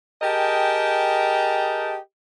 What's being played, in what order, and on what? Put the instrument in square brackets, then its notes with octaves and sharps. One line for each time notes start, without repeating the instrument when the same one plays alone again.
[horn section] G4 G#4 A#4 D#5 G5 A5